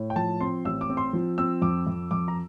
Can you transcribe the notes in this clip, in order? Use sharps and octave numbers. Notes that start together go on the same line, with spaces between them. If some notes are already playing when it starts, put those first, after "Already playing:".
Already playing: A2
G5
F3 A5
C4 C6
A1 E6
D6
C4
C6
F3
C4 E6
F2 D6
F2
F2 D6
A#5